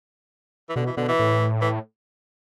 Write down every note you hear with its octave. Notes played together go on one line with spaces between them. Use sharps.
E3
B2 D3
E3
B2 D3
E3
A2
E3